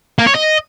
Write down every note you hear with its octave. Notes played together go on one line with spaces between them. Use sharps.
A#3
C#5
D#5